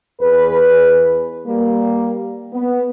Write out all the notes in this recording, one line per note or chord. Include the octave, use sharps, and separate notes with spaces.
E2 G#4 B4
G3 A#3
B3